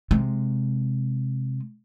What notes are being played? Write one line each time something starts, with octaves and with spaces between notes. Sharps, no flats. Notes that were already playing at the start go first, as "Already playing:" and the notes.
C3 G#3